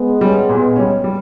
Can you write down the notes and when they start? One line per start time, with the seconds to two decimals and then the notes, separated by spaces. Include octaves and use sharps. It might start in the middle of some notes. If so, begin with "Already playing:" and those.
Already playing: G#3 B3
0.21 G3 C#4
0.49 A#2
0.76 G3 C#4
1.04 G3